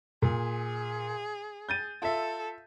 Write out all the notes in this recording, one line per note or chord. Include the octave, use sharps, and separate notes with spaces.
A#2 G#4
G6 A6 D#7
F4 A4 E5